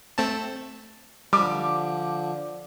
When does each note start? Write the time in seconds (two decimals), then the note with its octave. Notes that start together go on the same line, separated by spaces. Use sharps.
0.18 A3 C4 A5
1.33 D3 F3 G3 D6